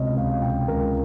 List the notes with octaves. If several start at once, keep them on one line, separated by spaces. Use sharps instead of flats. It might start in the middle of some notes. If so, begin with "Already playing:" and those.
Already playing: C#2 C3 C#5 D#5
C#2 F5
C3 G5
C#2 A#4